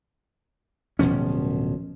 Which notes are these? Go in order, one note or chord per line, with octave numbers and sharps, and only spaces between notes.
D1 B2 F3 C#4